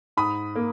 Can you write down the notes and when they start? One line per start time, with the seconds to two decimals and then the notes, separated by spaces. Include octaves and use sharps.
0.17 G#2 B5 D#6
0.56 A#3